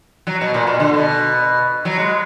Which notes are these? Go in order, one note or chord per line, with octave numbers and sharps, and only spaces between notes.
F#3
B2
A#2
B2
D3
B2
F#3
G#3